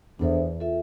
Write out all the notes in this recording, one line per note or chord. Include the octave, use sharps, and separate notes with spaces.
E2 D4 A4 C5 E5
F4 A4 E5